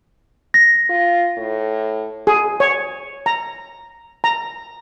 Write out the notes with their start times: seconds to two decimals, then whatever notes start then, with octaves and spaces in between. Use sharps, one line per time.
0.54 A#6
0.90 F4
1.37 A2
2.27 G#4
2.60 C#5
3.26 A#5
4.24 A#5